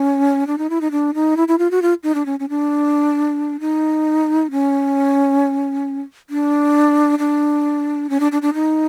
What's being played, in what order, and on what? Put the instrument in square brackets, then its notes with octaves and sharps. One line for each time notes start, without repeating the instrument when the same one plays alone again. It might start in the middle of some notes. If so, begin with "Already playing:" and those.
Already playing: [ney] C#4
D4
D#4
E4
D#4
D4
D#4
E4
E4
F4
F#4
F4
D#4
D4
C#4
C#4
D4
D#4
C#4
D4
D4
C#4
D4
D4
D4
D#4